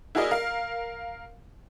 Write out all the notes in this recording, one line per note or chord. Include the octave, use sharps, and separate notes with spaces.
E4 F#4 G#4 A#4 D5 D#5
A#4 F5